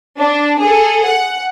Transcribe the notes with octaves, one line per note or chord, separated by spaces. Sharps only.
D4
G#4 A4
F#5